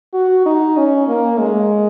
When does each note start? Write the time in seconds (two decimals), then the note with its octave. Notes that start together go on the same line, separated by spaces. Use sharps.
0.14 F#4
0.46 D#4
0.77 C#4
1.08 A#3
1.40 G#3